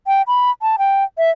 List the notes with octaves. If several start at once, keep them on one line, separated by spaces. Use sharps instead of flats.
G5
B5
A5
G5
E5